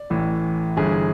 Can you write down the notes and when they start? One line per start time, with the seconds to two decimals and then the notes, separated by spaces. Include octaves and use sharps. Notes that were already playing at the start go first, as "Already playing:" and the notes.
Already playing: D5
0.10 A1 A2 E3
0.77 G1 G2 E3 G#4